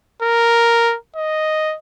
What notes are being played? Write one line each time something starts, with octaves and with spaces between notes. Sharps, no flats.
A#4
D#5